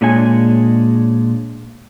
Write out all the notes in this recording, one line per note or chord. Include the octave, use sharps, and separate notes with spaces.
A#2 G#3 D4 C#5 G#5